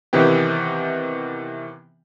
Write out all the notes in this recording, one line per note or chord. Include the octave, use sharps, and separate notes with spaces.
C3 D#3 E3 B3 G4